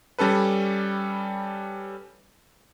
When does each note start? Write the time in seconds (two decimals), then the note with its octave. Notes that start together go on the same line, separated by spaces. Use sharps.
0.19 G3 C#4 A4 B4